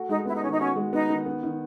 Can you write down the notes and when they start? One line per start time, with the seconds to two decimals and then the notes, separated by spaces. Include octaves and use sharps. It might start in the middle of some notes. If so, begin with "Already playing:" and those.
Already playing: A3 F#4
0.09 G#3 D#4
0.26 B3 E4
0.34 D#4
0.43 D#3 C#4
0.51 D#4
0.59 C#4 F#4
0.76 G#3
0.93 B3 D#4
1.09 D#3
1.26 B3
1.43 D#3